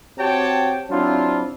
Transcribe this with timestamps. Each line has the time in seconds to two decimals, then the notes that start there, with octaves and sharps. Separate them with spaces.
0.18 C4 F#4 G4 C#5 G5 A5
0.90 F#3 C4 D4 E4 F4